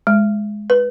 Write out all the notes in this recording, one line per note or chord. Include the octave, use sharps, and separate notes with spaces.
G#3
B4